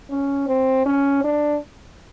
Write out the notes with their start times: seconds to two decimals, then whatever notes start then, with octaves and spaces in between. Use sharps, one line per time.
0.10 C#4
0.48 C4
0.86 C#4
1.24 D4